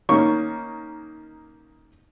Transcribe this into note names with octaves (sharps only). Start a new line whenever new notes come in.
D#3 A#3 C#4 C#6